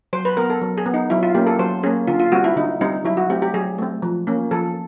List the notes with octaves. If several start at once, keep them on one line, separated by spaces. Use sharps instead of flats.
F#3 C5
B4
B3 A#4
A4
F#3
G#4
B3
D#4
F#3 E4
F4
A#3 C#4 G4
A4
F#3 C5
A#3 C#4 G#4
D3 F4
F4
G3 C4 F#4
E4
D3 D#4
G3 C4 D#4
F#3 E4
F#4
A3 C4 G4
G4
F#3 G#4
A3 C4
F3
A#3 C#4
F3 A4